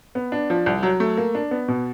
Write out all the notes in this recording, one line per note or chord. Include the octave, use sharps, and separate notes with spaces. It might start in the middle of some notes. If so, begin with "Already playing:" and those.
B3
D4
F3
C2
F#3
A3
A#3
D4
B3
B2